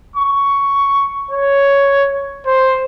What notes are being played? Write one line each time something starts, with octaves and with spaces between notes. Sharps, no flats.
C#6
C#5
C5